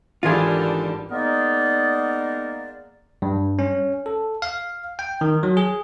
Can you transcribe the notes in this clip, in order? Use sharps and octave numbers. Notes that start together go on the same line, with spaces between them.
G#1 D3 E3 G3 F4 G#4 D6
G#3 A#3 B3 D#4 A#4 D5
G2
C#4
A4
F5
G5
D#3
F#3
G#4